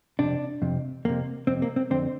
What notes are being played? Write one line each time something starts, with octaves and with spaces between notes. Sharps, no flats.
F2 C3 D4
F2 C3
F2 C3 A#3
F2 C3 C4
A#3
C4
F2 D3 C4